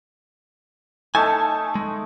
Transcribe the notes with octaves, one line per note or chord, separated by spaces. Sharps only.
A3 D#4 G#5 A5
G#3